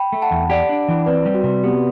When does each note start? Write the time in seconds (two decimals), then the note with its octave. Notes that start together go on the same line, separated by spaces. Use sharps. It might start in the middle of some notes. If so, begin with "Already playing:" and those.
Already playing: G5 B5
0.13 A3
0.22 F#5 A5
0.31 E2
0.50 G4 D5 F#5
0.69 D4
0.88 E3
1.06 C4 B4 D5
1.25 G3
1.34 F#4
1.44 C3
1.63 B3 G4